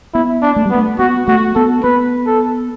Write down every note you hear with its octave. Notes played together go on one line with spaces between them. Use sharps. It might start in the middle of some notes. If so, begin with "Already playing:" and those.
B3 E4
D4
A3
G3
B3
A3
B3 F#4
A3 F#4
B3 A4
B3 B4
A4